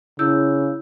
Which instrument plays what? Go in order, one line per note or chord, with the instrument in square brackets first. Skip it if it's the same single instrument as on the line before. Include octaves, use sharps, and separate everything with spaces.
[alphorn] C#3 [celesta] E4 E6 G6